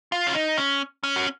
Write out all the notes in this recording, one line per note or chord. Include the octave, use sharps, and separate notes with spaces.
F4
C#4
D#4
C#4
C#4
F#4